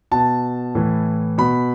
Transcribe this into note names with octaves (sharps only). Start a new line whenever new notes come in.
B2 A5
A2 E3
B2 B5